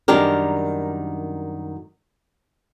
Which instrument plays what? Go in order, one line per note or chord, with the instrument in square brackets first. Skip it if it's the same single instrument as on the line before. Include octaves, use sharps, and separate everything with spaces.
[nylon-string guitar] F#2 D#3 G3 D4 G4 A#4